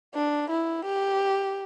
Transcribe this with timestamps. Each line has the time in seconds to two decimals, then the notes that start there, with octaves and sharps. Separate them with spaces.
0.14 D4
0.50 E4
0.85 G4